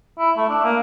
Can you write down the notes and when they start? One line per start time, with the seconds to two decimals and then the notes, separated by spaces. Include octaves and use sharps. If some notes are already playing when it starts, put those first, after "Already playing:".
0.19 E4
0.37 A3
0.49 D4
0.64 A#3